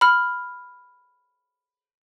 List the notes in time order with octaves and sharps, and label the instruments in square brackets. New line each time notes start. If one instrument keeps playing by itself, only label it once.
[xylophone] B5 F6